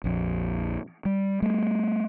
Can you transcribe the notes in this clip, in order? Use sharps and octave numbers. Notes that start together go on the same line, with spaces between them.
A#1 F2
G3
G3 A3